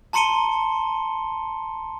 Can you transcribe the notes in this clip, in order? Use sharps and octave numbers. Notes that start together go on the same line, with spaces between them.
A5 A#5 C6 C#7 D#7 G7